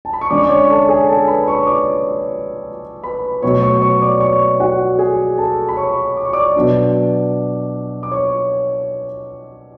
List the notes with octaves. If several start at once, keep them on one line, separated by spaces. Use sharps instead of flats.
A5
B5
C#6
D3 G#3 C#4 D5 D6
D6
C#5 C#6
A4 A5
G#4 G#5
A4 A5
B4 B5
C#5 C#6
D5 D6
B4 B5
B2 F#3 A3 C#5 C#6
C#5 C#6
C#5 C#6
D5 D6
C#5 C#6
F#4 F#5
G#4 G#5
A4 A5
B5
C#5 C#6
D6
C#6
D5 D6
B2 F#3 B3 D4
D6
C#5 C#6